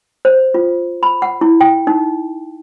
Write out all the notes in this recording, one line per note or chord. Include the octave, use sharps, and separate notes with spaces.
C5
F4
B5
F#5
E4
G5
D#4